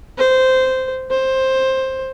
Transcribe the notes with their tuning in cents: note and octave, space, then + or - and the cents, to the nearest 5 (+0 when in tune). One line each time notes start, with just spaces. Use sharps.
C5 -10
C5 +10